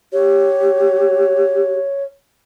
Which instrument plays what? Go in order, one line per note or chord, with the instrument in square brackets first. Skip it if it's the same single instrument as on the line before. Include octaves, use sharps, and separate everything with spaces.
[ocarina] G4 [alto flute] C#5